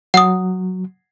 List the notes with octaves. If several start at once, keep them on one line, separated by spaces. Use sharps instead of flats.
F#3 F#5 D#6